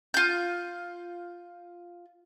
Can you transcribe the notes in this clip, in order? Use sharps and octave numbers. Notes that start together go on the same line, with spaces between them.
F4 G6